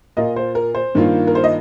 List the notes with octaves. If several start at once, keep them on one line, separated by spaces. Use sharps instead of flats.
A#2 A#3 F4 A#4 D#5
C5
A#4
C5
G2 D#3 A#3 F4
A#4
C5
D#5